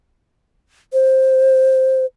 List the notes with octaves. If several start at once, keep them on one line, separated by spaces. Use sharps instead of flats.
C5